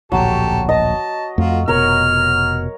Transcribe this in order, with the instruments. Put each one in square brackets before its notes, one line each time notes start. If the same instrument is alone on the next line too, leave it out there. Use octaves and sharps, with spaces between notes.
[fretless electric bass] D1 A#1 [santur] F#3 [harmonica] G4 A4
[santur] D#5 [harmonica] A5
[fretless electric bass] F2 A3 [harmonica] F4 F#4
[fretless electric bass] F1 B2 [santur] A#4 C#5 [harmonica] F6